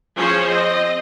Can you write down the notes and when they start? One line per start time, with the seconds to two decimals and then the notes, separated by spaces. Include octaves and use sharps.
0.15 F3 C#4 G#4 C5 C#5
0.49 C4 D#5